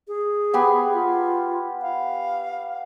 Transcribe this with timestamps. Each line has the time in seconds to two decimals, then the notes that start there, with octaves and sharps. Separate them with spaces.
0.08 G#4
0.53 B3 G4 G#5
0.94 F4
1.82 F5